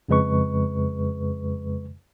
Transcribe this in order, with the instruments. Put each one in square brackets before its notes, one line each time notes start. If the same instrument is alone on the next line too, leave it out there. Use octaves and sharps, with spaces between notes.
[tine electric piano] F2 C#3 G#3 B4 C#6